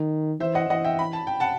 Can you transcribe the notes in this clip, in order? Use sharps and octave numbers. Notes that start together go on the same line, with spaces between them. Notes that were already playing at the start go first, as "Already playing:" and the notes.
Already playing: D#3
E3 C5 E5
D#5 F#5
E3 D#5 F#5
E5 G5
B5
A5
G5
F#5 A5